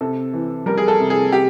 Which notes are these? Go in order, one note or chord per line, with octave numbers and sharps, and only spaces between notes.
C3 A4
E3
G3 A#4
G#4
A4
C3
G#4
C3 G4